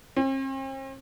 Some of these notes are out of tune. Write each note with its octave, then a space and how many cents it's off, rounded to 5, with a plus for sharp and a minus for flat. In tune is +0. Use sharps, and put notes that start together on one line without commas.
C4 +45